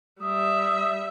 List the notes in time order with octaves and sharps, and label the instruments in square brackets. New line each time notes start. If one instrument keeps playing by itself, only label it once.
[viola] G3 E5 [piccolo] D#6